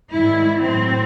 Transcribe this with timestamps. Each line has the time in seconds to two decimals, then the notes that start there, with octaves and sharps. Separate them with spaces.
0.13 G#2 D#3 G3 E4
0.64 A2 F#3 C4